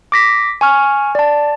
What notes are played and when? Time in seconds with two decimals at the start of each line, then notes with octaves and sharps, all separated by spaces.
0.12 D6 A#6 B6
0.61 G#5 C#6 F6
1.15 D5 A5